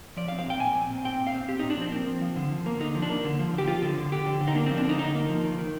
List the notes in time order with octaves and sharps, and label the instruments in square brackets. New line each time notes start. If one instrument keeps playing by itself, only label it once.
[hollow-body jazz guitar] F3 D5
F5
C4
F5
A#2 G5
A#2 G#5
C4
A#2
C4 G5
A#2
F5
C4
C4 G4
A#2 D#4
D4
F3 C4
A#3 C4
F3
F3
D3
F3
A#3
D3 D#4
F3
D4
A#3
D3
F3
D3
G4
F3 F4
D3
D3
D3 G4
D3
D3
D#4
A#3 D4
F3 C4
D4
D3 D#4
D3 D#4
A#3
F3
D#3
D#3